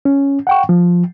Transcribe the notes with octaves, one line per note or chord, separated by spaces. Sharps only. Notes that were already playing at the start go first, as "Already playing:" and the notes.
C#4
F#5 G5 C#6
F3